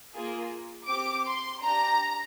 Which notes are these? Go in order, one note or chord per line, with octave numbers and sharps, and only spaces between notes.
A#3 F4 G#4
C4 G4 D6
C6
D4 G4 A#5